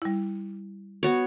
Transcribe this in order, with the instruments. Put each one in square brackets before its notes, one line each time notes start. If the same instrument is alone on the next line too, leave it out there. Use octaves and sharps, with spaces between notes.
[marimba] G3 E4
[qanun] B3 F#4 C#5